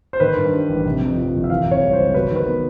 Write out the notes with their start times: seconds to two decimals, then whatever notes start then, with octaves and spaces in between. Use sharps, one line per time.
0.13 C5
0.20 D#3 B4
0.37 G2
0.53 G3
0.69 A1
0.86 C3
1.01 F2
1.17 F3
1.34 F#1
1.44 E5
1.50 E3 F5
1.66 C3
1.71 C#5
1.82 G3
1.93 C5
1.98 C#2
2.14 F#3 B4
2.31 D#3
2.36 B4
2.47 B3